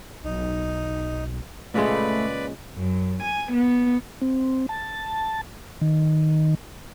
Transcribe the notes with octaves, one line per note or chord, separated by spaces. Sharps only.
B1 D#4
A#2 C#3 G#3 A3 B4 D5 B5
F#2
G#5
B3
C4
A5
D#3